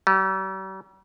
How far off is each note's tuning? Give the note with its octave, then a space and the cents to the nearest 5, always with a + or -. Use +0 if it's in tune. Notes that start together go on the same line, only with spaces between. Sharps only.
G3 -45